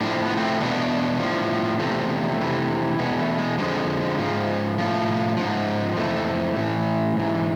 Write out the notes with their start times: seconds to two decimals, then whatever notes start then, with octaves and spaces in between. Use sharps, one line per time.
0.01 A2 F3 D4
0.13 C4
0.26 B3
0.37 A3 C4
0.60 E2 B2 B3 D4
1.20 A2 F3
1.79 E2 C3 F3 A3 C4
2.39 F2 C3 E3
2.99 E2 B2 G#3 B3
3.19 A3
3.38 G#3
3.58 F2 D3 F3 G#3
4.19 G#2 F3
4.78 A2 F3
5.37 G#2 F3
5.97 F2 E3 A3
6.56 A2 E3
7.16 G#2 E3